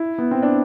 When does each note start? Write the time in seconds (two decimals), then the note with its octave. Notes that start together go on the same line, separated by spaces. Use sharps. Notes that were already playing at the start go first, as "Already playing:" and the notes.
Already playing: E4
0.18 B3
0.31 C4
0.42 D4